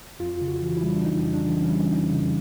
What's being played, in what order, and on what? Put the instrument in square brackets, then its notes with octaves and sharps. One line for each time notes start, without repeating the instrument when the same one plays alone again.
[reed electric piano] F2 F4
C#3
F#4
E3
E4
G3
D4
F2 D#4
C#3
D4
E3
C#4
G3
F2 D#4
C#3